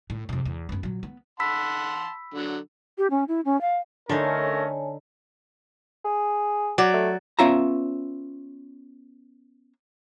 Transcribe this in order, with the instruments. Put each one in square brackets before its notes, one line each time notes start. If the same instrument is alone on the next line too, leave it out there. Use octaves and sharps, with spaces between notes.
[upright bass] A2
F2 C3
E2
F#2 B3
A#2 F#3
B3
[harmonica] F#5 A5 C6 [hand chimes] B5 E6 B6
[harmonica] D3 F#3
[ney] G4
C#4
E4
C#4
F5
[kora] D3 D#4 [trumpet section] A3 C#4 A#4 [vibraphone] C#5 G#5 A5
[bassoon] G#4
[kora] F#3 D5
[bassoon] A3
[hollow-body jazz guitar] B3 C#4 F4 E5 A#5